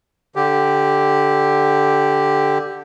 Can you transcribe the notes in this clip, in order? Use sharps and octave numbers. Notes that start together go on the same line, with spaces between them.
D3 G4